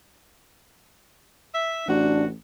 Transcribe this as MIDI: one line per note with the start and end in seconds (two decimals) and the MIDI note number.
1.53 1.85 76
1.87 2.33 33
1.87 2.26 48
1.87 2.24 62
1.87 2.26 66